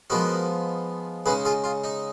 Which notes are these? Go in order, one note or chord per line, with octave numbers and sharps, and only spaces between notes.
F3 G#3 B3 D#4 F#4 A#4
C#3 G#3 D#4 G#4 B4
F4 G#4
F4
D#4